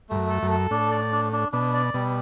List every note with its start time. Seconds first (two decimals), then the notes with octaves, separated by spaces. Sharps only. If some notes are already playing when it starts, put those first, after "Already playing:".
0.09 G2 A3
0.15 F#2
0.29 A4
0.43 F#2
0.51 A4
0.71 A2 D4
0.91 D5
1.12 D4
1.32 D4
1.52 B2 D4
1.74 D5
1.94 B2 G3